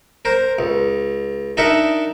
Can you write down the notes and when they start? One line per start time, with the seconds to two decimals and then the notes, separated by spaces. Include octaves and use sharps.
0.25 A#4 C5
0.59 C#2
1.57 D4 D#4 A#4 E5 F#5